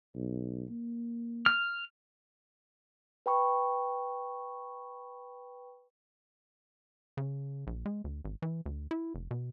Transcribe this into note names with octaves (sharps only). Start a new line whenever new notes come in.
B1
A#3
F6
B4 G5 B5 C#6
C#3
A#1
G#3
D2
G#1
E3
D2
E4
F1
B2